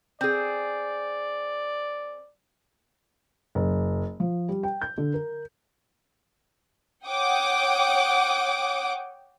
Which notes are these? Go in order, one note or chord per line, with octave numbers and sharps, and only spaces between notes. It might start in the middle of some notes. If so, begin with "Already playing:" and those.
C4 G#4 D5
F#1
F3
G3
G5
G6
D3
A#4
C#5 F#5 G5 D6 D#6